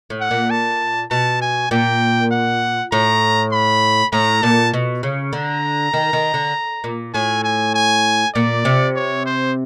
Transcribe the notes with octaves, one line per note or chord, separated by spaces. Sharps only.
A2
F#5
A#2
A5
B2 A5
G#5
A#2 G5
F#5
A2 A#5
B5
A2 A#5
A#2 A5
B2
C#3
D3 A#5
D#3
D#3
D3
A#2
A2 G#5
G#5
G#5
A#2 D5
C3
C#5
C5